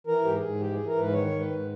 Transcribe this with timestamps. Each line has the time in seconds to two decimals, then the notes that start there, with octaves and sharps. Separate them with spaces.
0.07 E3 A#4
0.24 G#2 G4
0.33 G#4
0.42 G#2
0.60 E3 G4
0.73 E3 G#4
0.87 A#4
0.95 G#2 B4
1.13 D#3 C#5
1.31 G#2
1.40 B4
1.48 G#2